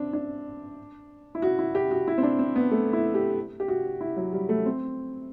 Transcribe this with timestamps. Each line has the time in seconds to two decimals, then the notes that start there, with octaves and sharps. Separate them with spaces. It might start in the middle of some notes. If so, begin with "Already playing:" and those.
Already playing: C4 D4
0.13 D4
1.35 E4
1.42 F#4
1.59 E4
1.75 G4
1.91 F#4
2.08 E4
2.18 C4
2.23 D4
2.39 C4
2.56 B3
2.71 A3
2.93 E4
3.15 G4
3.60 G4
3.68 F#4
4.01 E4
4.17 F#3
4.33 G3
4.49 A3
4.66 C4